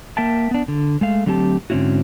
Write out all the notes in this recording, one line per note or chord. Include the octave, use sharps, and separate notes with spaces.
A#3 A#4 E5 G5 A5
B3 D4
D3
G#3 A3 F5
D3 F#3 A3 C4 G4 A5
G#2 D3 C4 C#4 E4 F#4